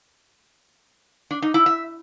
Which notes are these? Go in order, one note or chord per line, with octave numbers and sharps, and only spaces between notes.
D4
D#4
E4
E5